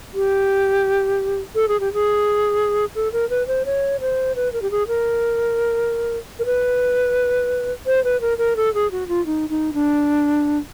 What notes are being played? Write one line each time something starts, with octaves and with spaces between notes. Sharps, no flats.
G4
A4
G#4
G4
G#4
A4
A#4
B4
C5
C#5
C5
B4
A#4
G4
G#4
A#4
A#4
B4
C5
B4
A#4
A#4
A4
G#4
F#4
F4
D#4
D#4
D4